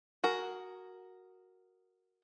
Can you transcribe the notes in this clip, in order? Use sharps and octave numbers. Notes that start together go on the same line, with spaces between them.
F#4 G#4 A#4